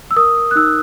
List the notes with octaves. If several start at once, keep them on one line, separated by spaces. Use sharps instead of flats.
E6
A#4 D#6
F#6
D#4 E6